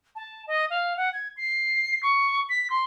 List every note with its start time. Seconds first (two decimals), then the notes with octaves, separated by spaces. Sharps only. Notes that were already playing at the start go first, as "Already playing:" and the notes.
0.16 A5
0.47 D#5
0.70 F5
0.97 F#5
1.13 G#6
1.37 C7
2.03 C#6
2.49 B6
2.70 C6